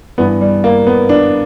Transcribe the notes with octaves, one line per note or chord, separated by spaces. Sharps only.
G2 E3 B3
G3
A#3
B3
D4